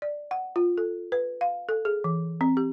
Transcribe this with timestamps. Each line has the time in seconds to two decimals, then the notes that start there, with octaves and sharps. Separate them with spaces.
0.02 D5
0.31 F#5
0.56 F4
0.78 A4
1.12 B4
1.41 F5
1.69 A4
1.85 G#4
2.04 E3
2.41 C4
2.57 G4